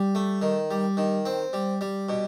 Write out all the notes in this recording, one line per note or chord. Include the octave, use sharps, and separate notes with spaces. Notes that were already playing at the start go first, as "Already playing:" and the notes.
Already playing: G3
A3
D#3
G3
D#3
C4
G3
G3
B2